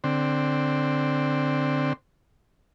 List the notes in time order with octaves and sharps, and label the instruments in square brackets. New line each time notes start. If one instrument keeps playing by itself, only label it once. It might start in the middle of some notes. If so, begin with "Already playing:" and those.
[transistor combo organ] D3 C4